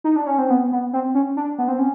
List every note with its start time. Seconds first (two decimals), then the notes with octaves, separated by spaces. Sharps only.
0.04 D#4
0.16 D4
0.27 C#4
0.38 C4
0.50 B3
0.72 B3
0.93 C4
1.15 C#4
1.37 D4
1.58 B3
1.68 C4
1.79 C#4